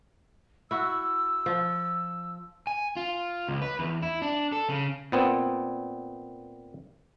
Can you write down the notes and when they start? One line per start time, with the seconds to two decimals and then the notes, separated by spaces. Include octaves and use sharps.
0.71 E4 F#4 E6
1.46 F3
2.67 G#5
2.97 F4
3.48 C#2
3.62 B4
3.79 E2
4.03 E4
4.22 D4
4.52 A4
4.70 C#3
5.12 A#2 B3 C4